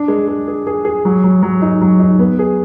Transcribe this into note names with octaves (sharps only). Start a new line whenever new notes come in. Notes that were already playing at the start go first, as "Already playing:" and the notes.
Already playing: D4
G#3
G#3
G#4
G#4
G#4
F#3
F#3
F#3
D#4
F#3
D#4
B3
G#4